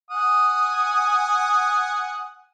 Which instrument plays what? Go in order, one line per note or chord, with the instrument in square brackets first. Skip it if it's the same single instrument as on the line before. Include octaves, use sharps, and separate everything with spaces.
[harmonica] F#5 G#5 D#6